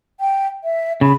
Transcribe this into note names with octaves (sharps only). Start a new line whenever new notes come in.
G5
E5
C#3 B5